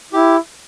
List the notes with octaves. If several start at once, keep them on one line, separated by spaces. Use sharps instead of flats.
E4 G4